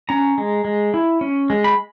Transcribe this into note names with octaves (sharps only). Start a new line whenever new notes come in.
C#4 A#5
G#3
G#3
E4
C#4
G#3
B5